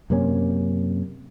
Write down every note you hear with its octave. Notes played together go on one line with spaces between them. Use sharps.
F#2 C3 A#3 C#4